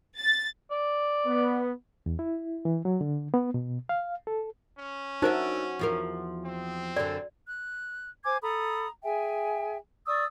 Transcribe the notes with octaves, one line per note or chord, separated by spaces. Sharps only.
A6
D5
B3
E2
E4
E3
F#3
D3
B3
B2
F5
A4
C#4
D4 D#4 F#4 A#4 C5 E5
E2 F3 A#4
C4
F#2 D3 D5
F#6
C5 G#5 D6 G#6
A4 A#5 B5 D#6
G#4 E5 G5 G#5
D5 C#6 D#6 E6